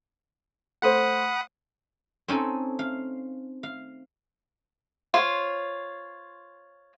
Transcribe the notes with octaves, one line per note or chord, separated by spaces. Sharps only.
A3 C5 F#5 B5 D#6
C4 C#4 D#4 A4
F5
F5
F4 C5 C#5